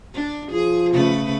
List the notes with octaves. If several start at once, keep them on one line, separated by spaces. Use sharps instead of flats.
D4
F3 G#4
C#3 A3 B4